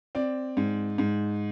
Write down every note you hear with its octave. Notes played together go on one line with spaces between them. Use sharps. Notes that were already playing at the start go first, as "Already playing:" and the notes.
C4 D5
G#2
G#2